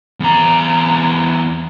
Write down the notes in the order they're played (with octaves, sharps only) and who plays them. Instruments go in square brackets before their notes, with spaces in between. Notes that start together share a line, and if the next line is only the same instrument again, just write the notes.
[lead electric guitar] E2 A#5